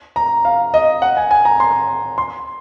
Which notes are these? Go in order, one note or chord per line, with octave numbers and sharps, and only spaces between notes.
A#5
F5
D#5
F#5
G#5
G#5
A#5
C6
C6